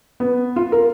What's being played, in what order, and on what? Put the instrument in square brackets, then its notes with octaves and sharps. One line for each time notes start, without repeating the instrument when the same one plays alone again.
[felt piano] B3
F4
A#4